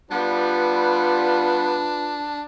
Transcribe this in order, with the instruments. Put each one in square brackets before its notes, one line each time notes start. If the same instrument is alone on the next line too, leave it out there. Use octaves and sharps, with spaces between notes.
[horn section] G3 B3 [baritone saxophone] D4 [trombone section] F4 B4